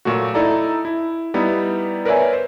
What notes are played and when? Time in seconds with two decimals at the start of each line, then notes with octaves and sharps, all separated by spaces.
0.05 A#2 F#3 A3 F#4
0.34 D#4 E4 A4 D5 A#5
0.85 E4
1.34 G3 B3 D#4 E4
2.05 A#4 B4 C#5 D5 E5 G#5
2.33 C5